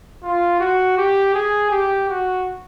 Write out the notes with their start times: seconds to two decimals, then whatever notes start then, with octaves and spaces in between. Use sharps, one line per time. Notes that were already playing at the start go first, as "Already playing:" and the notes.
0.23 F4
0.60 F#4
0.98 G4
1.34 G#4
1.71 G4
2.09 F#4